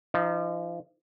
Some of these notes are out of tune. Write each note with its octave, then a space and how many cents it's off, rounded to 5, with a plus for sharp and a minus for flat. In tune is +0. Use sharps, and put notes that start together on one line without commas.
F3 -30 D#4 +0